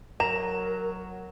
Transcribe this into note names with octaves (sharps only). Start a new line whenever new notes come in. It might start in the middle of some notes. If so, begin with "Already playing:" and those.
F#3 A#4 A#5 E7